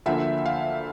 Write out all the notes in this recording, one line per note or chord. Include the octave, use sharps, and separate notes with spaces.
D2 D3 F3 A#3 E5
F5